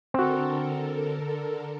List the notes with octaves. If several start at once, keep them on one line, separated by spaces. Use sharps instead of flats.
D3 C4 F#4 A4 A#4